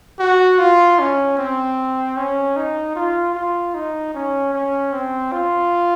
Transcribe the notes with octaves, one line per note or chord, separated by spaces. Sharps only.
F#4
F4
C#4
C4
C#4
D#4
F4
F4
D#4
C#4
C#4
C4
F4